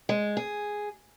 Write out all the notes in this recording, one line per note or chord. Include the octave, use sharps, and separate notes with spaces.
G#3
G#4